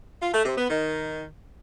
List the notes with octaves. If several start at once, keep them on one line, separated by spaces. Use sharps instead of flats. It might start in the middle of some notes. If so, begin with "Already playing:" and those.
F4
A3
C3
B3
D#3